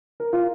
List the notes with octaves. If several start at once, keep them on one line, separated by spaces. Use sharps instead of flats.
A#4
F4